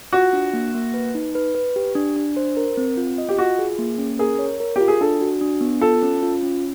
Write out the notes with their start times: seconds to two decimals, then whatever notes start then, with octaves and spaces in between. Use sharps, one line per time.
0.13 F4 F#4
0.33 D4
0.53 A#3
0.75 A#3
0.94 B4
1.15 D#4
1.35 B4
1.55 B4
1.76 G4
1.95 D4
2.16 D4
2.37 C5
2.57 A#4
2.77 C4
2.97 F4
3.18 D#5
3.29 G4
3.38 F4 F#4
3.59 G#4
3.78 A#3
3.98 C#4
4.19 G#4 A#4
4.39 C#5
4.60 A#4
4.76 F4 G4
4.88 G#4
5.01 D4 A4
5.21 F#4
5.41 D4
5.61 B3
5.81 F4 A4
6.02 C#4
6.23 F4
6.43 C#4